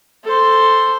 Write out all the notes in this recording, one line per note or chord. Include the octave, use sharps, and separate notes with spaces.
A4 C5